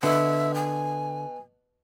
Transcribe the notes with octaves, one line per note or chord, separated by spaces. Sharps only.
B2 D3 E5
G#5